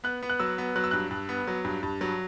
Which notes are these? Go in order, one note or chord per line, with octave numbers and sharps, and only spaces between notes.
B3 F#6
B3
F#6
F#3 E6
B3
F#3 F#6
E6
G2 F#6
G2
B3
F#3
G2
G2
F#3